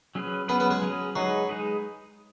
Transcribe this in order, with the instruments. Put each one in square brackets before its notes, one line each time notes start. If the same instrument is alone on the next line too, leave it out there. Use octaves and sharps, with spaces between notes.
[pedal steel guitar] F#3 C#4 G#4 B4
[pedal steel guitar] F#3 C#4 G#4 B4 [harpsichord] B3
[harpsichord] B3
G#3
[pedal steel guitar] F#3 C#4 G#4 B4
[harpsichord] F#3 [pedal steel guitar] G#3 D#4 G#4 B4
[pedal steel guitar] G#3 D#4 G#4 B4